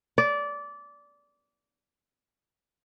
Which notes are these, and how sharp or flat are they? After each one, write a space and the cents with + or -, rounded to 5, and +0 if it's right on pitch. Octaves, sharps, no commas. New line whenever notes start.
D5 -20